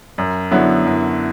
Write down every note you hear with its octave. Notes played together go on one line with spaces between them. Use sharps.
F#2
D3 F#3 B3 E4
F#2